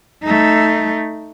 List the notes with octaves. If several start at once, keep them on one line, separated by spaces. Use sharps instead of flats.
A3 D#4